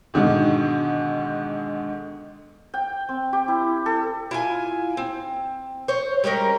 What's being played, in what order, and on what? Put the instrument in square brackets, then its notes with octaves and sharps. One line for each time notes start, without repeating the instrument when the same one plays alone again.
[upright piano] G#2 B2 D3 D#3
[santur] G5
C4
G4
E4
A4
[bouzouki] E4 F4 G#5
C4
C5 C#5
G3 G#3 C#4 A#4